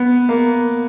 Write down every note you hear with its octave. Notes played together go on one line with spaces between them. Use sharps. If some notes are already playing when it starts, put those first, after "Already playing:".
Already playing: B3
A#3